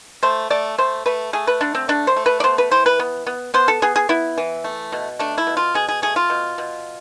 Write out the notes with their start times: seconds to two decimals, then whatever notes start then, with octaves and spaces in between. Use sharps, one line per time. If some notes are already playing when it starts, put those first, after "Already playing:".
0.23 A3 C5
0.50 A3 D5
0.78 A3 C5
1.06 A3 B4
1.33 A3 G#4
1.47 B4
1.61 D3 D4
1.75 C4
1.88 A3 D4
2.07 C5
2.16 A3
2.26 B4
2.40 D5
2.43 B3 C5
2.58 B4
2.71 E3 C5
2.86 B4
2.99 B3
3.27 B3
3.54 B3 C5
3.68 A4
3.82 B3 G#4
3.96 G#4
4.09 B3 E4
4.38 E3
4.64 A3
4.92 B2
5.19 A3 D4
5.38 E4
5.47 B2
5.57 F4
5.74 B2 G#4
5.88 G#4
6.02 A3 G#4
6.16 F4
6.30 B2
6.58 B2